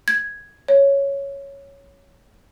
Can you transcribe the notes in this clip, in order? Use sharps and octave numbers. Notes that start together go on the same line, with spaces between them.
G#6
C#5